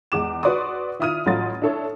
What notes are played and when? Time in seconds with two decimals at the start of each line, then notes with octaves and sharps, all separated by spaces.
0.12 E2 G#3 D6 E7
0.43 F#4 B4 D5 C6 C#6 D#6
0.99 D#3 E4 F4 D#6 F6 D#7
1.26 A1 F#3 A3 F4 C6 A6
1.62 D4 E4 A4 C#5